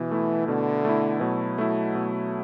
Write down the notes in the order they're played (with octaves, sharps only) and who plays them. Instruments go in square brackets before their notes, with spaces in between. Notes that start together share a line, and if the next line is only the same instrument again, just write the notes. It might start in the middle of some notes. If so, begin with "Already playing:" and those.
Already playing: [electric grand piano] B2 [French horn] E3
[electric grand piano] A3 E4
[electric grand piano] B2 [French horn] D3
[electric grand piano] A3 E4
[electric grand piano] B2 [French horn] F#3
[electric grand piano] A3 E4
B2